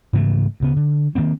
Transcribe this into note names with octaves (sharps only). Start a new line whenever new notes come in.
G#2 C#3 E3 A3
D2 C#3 B3
D3
D#3 F3 A#3 C4